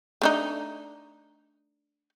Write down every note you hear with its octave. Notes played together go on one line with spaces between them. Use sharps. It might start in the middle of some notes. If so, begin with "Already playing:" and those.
A3 D4 D#4